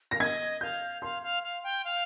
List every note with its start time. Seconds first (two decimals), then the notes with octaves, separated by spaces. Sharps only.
0.11 F5 A#6
0.20 D#5 G#6
0.61 F5 G6
1.02 F5 C6
1.22 F5
1.43 F5
1.63 G5
1.84 F5